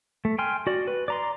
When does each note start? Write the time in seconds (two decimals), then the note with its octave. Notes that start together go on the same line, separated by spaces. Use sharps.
0.25 A3
0.38 G5 G#5 C6 F6
0.67 F#4 D5
0.87 B4
1.08 D5 A#5 C6